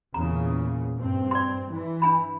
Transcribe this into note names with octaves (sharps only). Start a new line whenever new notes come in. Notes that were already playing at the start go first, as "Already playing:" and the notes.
E2 A#2 C#3 A#5
G2 C4
D5 C6
E3
D4 G#5 B5